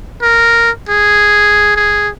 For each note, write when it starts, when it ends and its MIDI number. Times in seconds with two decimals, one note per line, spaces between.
0.22 0.70 70
0.89 1.73 68
1.76 2.10 68